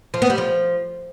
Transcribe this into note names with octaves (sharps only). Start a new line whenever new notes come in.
F3
B3
G3
F3